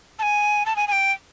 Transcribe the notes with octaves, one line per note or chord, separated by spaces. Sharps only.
A5
G#5
A5
G#5
G#5
G5